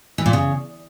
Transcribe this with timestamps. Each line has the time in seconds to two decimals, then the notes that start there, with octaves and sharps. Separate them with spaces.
0.18 E3
0.26 A#2
0.33 C#3